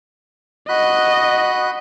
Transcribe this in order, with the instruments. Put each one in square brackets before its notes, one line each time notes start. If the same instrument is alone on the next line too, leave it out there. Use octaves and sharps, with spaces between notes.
[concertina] F#4 B5 F#6 [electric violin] D#5